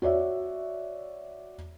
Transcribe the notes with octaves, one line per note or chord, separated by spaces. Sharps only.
F#4 C#5 D5 E5